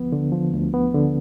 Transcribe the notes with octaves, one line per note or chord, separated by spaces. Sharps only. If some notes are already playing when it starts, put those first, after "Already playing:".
Already playing: D2 F3 B3
D3
F3
D2
B3
D3